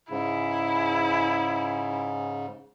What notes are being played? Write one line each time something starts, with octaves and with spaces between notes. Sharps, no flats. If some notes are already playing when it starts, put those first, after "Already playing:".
G#2 C#3 E4